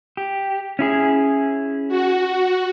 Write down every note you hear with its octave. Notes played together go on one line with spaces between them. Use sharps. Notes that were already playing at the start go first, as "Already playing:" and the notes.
G4
C#4 E4 G#4
F#4